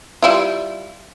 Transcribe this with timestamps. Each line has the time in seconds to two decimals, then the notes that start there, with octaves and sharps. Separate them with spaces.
0.22 G3 E4 F4